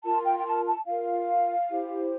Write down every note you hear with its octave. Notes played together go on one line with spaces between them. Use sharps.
F4 A#4 A5
G5
G5
A5
A5
F4 A#4 F5
E4 G4 C5